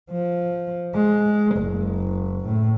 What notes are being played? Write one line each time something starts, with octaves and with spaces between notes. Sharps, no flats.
F3
G#3
F#1
A2